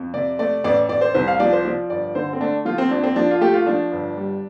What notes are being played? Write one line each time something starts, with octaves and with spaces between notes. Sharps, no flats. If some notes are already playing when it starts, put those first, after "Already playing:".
Already playing: F2
C3 D5
A3 D5
A1 D5
A1 D5
C5
C2 C5
F5
F3 D5
C5
F3 D5
G1 D5
D3 C5
C4
A3 D4
F3 F4
C4
F2 D4
C4
F3 D4
F4
A3 G4
F4
F3 D4
G1
G3